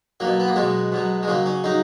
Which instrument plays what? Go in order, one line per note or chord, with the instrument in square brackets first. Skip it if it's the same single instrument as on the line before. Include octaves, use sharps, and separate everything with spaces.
[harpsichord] B2 F#3 A#3
B3
A#3
B2 F#3 G#3
B2 F#3
G#3
C#3 F#3 A#3
C#4
C#3 F#3 D#4